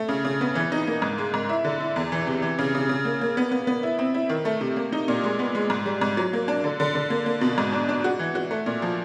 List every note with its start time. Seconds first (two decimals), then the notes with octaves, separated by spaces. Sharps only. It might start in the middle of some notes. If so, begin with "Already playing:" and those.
Already playing: A3
0.09 C#3
0.25 C#3
0.41 B3
0.55 E3
0.72 D#4
0.87 A#3
1.02 G#2
1.18 G#3
1.34 G#2
1.49 E4
1.65 D3
1.80 E4
1.96 E2
2.12 E3
2.27 C3
2.42 E3
2.59 C#3
2.75 C#3
2.89 C#3
3.05 A#3
3.21 A#3
3.37 B3
3.51 B3
3.67 B3
3.83 E4
3.99 C4
4.14 E4
4.29 D#3
4.45 A3
4.61 C3
4.76 A#3
4.92 D#4
5.08 A#2
5.24 G#3
5.39 B3
5.55 G#3
5.70 G#2
5.86 G3
6.01 G#2
6.17 F#3
6.33 A#3
6.48 D4
6.64 D3
6.80 D3
6.95 D3
7.10 A#3
7.26 A#3
7.41 B2
7.58 G#2
7.72 D4
7.89 D4
8.04 F#4
8.19 E3
8.35 F#4
8.51 A3
8.66 A#2
8.82 F3